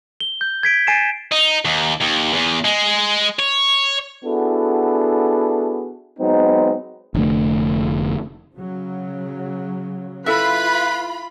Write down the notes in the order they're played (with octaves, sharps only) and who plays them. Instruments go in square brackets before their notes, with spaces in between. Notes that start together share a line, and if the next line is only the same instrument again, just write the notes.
[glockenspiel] G7
G6
G#6 B6 D7
G#5 A6 C7 D7 E7
[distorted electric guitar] D#4
D#2
D#2
E2
G#3
C#5
[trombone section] B3 D4 E4 F#4 G#4 A4
F#3 G#3 B3 C4 D#4
[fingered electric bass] F1 D3 A3
[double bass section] C#3 F#3
[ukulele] E4 A4 E5 [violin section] F4 B5 [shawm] B4